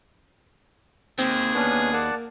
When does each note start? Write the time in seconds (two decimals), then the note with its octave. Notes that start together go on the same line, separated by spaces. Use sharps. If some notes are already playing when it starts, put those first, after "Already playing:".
1.19 D#2 C4 G#4
1.55 B3 C#4 D4
1.93 A#3 D5 F#5 A5